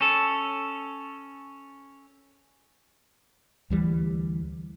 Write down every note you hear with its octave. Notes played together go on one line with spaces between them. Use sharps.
C#4 A4
D2 E3 G3